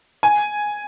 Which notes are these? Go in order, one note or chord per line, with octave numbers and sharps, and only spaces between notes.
G#5